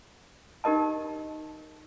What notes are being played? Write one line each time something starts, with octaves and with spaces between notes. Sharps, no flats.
D#4 G4 A#4 D#5 A5